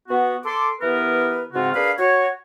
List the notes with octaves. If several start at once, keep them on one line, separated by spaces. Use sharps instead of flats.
B3 F#4
A4 C6 D6
E3 B3 G4 A#4 B4
G#2 C#3 C4 F4 F#4
D4 G#4 A#4 B4 F5
F#4 C#5